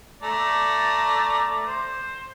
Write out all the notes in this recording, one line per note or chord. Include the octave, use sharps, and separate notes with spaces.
A3 D5 A#5
C5